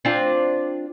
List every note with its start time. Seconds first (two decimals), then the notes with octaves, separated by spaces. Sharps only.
0.05 C4 D4 F4